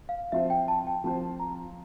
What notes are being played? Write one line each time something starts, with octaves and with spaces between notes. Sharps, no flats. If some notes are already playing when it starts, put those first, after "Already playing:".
F5
F3 C4 F4 C5 E5
G5
A5
G5
F3 C4 F4 C5 A5
A#5